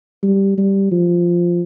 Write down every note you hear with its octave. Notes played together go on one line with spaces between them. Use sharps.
G3
G3
F3